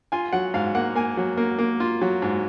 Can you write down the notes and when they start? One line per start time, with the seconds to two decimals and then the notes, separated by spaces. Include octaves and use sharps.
0.12 F4 G#5
0.33 F#3 F#5
0.54 G#2 F5
0.75 A#3 F#5
0.95 A#3 G#5
1.17 F#3
1.37 A#3
1.59 A#3
1.80 F4
2.02 F#3
2.22 G#2